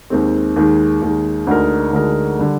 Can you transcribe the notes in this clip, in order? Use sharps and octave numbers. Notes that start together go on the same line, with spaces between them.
D#2 D#3 G#3 C4
D#2 D#3 G#3
D#2 D#3 G#3
D2 D3 G#3 D#4 A#4
D2 D3 G#3 D#4 A#4
D3 G3